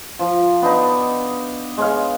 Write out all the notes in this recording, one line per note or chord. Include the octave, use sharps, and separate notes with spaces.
F3
B3 D4 D#4
G#3 C#5 F5